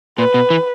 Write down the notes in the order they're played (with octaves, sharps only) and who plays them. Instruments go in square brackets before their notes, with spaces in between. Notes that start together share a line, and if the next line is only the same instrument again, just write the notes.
[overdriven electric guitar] A#2 [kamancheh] B4
[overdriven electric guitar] B2
E3